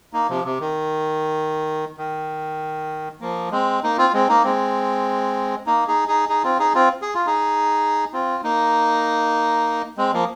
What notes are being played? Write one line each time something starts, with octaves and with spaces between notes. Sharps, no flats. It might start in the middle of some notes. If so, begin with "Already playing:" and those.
A#3 D#4
C3 F3
C3
D#3
D#3
F3 A#3
G#3 C4
A#3 D#4
C4 F4
G#3 C4
A#3 D#4
G#3 C4
A#3 D#4
D#4 G#4
D#4 G#4
D#4 G#4
C4 F4
D#4 G#4
C4 F4
G#4
F4
D#4 G#4
C4 F4
A#3 D#4
G#3 C4
F3 A#3